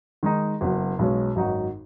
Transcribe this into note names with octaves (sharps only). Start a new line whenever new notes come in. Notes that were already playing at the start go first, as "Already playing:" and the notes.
D#3 G#3 D#4
F#1 F#2 F#3 B3 F#4
B1 B2 G#3 C#4
G#1 F#2 F#3 D#4 F#4